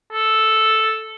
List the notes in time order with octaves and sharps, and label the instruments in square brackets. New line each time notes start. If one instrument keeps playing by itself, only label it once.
[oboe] A4